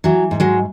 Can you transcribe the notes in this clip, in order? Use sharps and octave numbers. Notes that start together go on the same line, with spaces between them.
E3 F#3
G#2
F#3 G#3